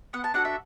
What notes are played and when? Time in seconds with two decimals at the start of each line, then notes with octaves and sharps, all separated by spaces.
0.13 B3 F#5
0.24 A5
0.34 D4 F#4 A4 F#5
0.45 E5